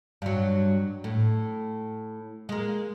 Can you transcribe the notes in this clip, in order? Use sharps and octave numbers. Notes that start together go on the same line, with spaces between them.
G2 F#3
A2
G#3 A#3